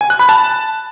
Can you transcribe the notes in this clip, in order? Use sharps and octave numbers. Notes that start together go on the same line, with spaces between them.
G#5
F#6
B5
A5